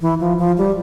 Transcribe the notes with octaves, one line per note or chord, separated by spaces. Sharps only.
E3
F3
F3
G3